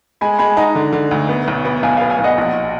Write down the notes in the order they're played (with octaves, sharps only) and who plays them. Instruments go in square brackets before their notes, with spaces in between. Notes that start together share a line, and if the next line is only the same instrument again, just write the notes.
[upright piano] G#3 [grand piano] G#5 B5
[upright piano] G#3 [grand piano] G#5 B5
[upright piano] D#4 [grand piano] F#5 A#5
[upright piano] D3
D3
D2
B3
B1
B3
[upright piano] B1 [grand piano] F5 G#5
[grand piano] F5 G#5
[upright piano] B3
[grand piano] F5 G#5
[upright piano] B1
[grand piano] D#5 F#5
[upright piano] A#1